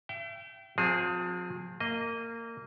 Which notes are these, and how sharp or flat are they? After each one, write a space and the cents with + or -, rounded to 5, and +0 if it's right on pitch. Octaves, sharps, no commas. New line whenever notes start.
E5 +35 G5 -25
F3 +40 C4 +0 G#4 +0
A#3 -20 D#5 +0